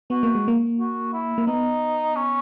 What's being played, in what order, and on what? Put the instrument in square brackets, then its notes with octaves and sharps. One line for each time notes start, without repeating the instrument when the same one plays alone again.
[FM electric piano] B3 [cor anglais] F#4
[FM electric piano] A#3
G#3
A#3
[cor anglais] F#4
E4
[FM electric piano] A#3
[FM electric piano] B3 [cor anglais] D#4
[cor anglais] C#4